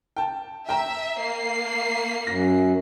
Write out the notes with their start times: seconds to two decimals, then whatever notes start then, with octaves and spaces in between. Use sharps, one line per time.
0.16 G5 A5
0.69 E5 G5 A#5
1.19 A#3 C7
2.27 F#2 A#6